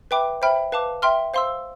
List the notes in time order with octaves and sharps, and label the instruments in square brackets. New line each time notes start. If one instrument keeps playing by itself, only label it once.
[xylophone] B4 E5 G5 B5 D6
C5 E5 G5 B5 F6
B4 F5 A5 D6
E5 G5 C6 F6
C5 F5 C6 E6